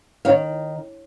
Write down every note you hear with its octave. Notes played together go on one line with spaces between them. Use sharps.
D#3 C#5 F5